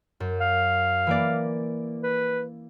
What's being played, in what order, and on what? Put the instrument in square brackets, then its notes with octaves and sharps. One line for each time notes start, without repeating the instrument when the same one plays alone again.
[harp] F#2
[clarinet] F5
[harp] E3 A#3 D5
[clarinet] B4